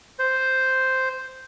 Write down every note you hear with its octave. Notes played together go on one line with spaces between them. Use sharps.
C5